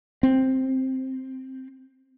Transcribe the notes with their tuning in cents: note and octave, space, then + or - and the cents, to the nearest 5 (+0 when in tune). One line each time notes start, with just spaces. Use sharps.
C4 +5